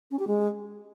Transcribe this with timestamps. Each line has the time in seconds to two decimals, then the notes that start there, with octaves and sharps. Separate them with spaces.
0.11 C#4
0.19 G4
0.27 G#3